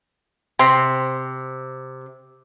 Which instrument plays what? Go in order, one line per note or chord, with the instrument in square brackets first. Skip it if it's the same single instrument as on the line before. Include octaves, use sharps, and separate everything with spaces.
[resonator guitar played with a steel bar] C3 [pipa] C4 G4 C6